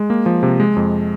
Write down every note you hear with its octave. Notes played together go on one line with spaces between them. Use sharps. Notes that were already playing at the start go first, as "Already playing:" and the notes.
Already playing: G#3
A#3
F3
C3
G#3
F2